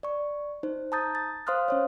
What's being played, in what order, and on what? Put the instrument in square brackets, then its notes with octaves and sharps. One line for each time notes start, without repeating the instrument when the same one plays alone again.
[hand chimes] D5 C#6
D#4 C5
A5 A#5 D#6 G6 A6
A6
C5 F5 C6 D#6 F6 F#6
C#4 C5 C#5